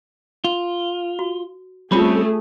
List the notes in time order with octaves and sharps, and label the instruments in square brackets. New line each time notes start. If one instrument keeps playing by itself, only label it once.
[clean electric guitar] F4
[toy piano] F#4
[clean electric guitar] G3 C4 C#4 [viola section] A3 G#4 [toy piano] F4 B5